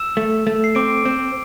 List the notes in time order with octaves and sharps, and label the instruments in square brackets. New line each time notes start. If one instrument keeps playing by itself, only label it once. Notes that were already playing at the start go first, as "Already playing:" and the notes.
Already playing: [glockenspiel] E6 E7
[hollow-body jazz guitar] A3
A3
[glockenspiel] C7
[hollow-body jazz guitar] C4 [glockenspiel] D6 D7
[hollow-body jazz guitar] C4